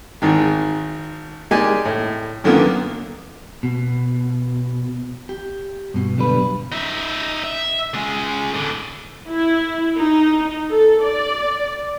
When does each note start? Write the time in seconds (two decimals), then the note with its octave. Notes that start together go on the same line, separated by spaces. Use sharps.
0.22 G#1 G#2 D#3
1.51 G#3 A#3 D#4 G4 D5 G#5
1.85 A2
2.44 F#2 D3 D#3 A#3 B3 F4
3.63 B2
5.29 G4
5.94 G2 B2
6.17 B1 D3 G3 B4
6.72 D#4 E5
7.44 E5
7.94 C#2 G#3
8.54 A2 D3
9.28 E4
9.95 D#4
10.70 A4
11.03 D5